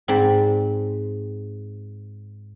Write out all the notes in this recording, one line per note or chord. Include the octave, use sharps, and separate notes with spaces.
G#2 C4 D5 B5